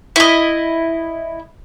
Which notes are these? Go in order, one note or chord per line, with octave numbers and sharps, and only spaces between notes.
E4 D#5